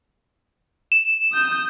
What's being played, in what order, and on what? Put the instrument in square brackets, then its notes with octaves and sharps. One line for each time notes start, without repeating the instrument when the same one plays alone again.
[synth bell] E7
[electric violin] D#6 G6